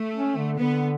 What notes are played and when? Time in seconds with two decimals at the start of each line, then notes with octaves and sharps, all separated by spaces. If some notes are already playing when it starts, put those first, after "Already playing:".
Already playing: A3
0.15 C#4
0.37 D3
0.59 D3 B3